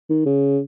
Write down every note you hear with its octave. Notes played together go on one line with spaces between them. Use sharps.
D#3
C#3